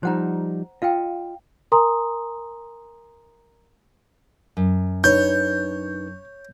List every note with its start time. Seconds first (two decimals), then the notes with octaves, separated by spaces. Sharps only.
0.03 F3 G3 D#4 C5 F#5 A#5
0.82 F4 D#5 F5 G5
1.72 A#4 G#5 A#5 C6 D#6
4.57 F#2
5.04 D4 D#4 B4 C#5 G6